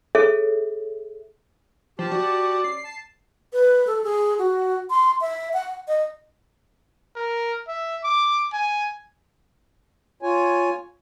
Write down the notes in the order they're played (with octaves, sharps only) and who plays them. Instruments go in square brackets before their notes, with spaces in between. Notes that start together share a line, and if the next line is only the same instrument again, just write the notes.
[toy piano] G#4 A4 C#5 E5
[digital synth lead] F3 [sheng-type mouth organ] G4 A5
[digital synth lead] F#4 [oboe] D5
[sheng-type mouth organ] C#4 [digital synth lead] C7
[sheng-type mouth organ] A5
[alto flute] B4
A4
G#4
F#4
C6
E5
F#5
D#5
[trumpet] A#4
E5
D6
G#5
[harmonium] F4 C#5 G#5